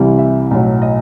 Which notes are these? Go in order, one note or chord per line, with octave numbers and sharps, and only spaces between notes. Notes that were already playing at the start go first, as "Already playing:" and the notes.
Already playing: C2 C3 E3 G3
E5
B1 A2 F#3
D#5